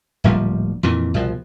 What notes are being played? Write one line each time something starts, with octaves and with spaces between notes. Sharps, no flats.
D1 A#1 F3 G3
F2 A#2 E3
C2 B2 F3